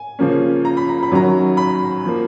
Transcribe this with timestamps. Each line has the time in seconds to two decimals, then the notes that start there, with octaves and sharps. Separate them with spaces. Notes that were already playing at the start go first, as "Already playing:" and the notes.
Already playing: G#5
0.19 C#3 F3 A#3 C#4
0.65 A#5
0.77 B5
0.89 A#5
1.03 B5
1.11 F#2 D#3 F#3 C#4 A#5
1.57 B5
2.06 F3 A#3